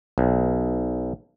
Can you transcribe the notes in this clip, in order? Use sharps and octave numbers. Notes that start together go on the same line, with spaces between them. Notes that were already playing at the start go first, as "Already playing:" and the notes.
B1